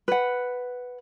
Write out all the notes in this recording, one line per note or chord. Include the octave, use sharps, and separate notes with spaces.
B4 F#5